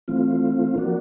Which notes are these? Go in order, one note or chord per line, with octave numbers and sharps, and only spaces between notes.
E3 A3 C4 F4
F3 A#3 D4 F#4